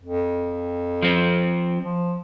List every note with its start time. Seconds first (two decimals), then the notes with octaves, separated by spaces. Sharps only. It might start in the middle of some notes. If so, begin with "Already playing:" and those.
0.03 F2
1.02 F3 C4
1.82 F3